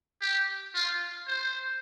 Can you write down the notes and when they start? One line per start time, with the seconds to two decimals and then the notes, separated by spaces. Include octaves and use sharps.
0.22 G4
0.75 F4
1.27 C5